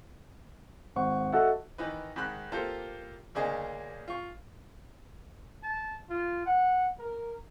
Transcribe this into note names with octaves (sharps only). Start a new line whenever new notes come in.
G#1 C5 F#5 C#6
F#4 A4 D#5 E5 F#5
D#3 E3 D#4 B4
G#2 D#3 B5 F#6
A#3 F4 G4 A4 C5
D2 C#3 A#3 D4 G#4 D#5
F4 C#6
A5
F4
F#5
A#4